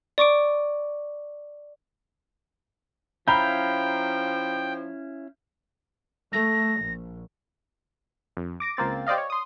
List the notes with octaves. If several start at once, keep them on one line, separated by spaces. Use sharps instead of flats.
D5 C#6 D6 D7
F3 C#4 E4 F5 G5 A#5 B5 G6
A3 A#6
A#1
F2
D6 A#6 D7
C#2 A#3 C4 A6
G4 C5 D5 D#5 F5
C#5
C6 D#6